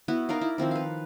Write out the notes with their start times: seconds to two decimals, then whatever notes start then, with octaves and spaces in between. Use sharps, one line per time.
0.08 B3 E4 F#4 B4
0.29 D#4 A#4 D5 F5
0.41 E4
0.58 D#3 F3 C4 E4
0.71 B4 F5